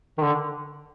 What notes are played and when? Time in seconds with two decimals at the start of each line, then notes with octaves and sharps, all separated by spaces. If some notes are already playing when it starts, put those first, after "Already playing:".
0.18 D#3
0.23 D3